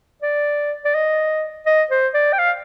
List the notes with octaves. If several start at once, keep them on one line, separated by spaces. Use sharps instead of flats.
D5
D5
D#5
D#5
C5
D5
G5
F5